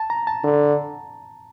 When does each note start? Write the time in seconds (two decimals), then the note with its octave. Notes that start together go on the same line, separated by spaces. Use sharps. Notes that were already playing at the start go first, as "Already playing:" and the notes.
Already playing: A5
0.10 A#5
0.27 A5
0.44 D3